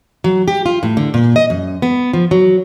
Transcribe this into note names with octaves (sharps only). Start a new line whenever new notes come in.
F#3
G4
F4
A2
D3
A#2
D#5
F#2
B3
F3
F#3